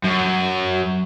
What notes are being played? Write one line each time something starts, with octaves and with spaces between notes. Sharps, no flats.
F#2